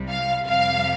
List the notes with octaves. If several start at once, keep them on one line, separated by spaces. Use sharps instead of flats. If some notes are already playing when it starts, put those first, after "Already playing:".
Already playing: C2 C3 G3
F5
F2 C3 G3 F5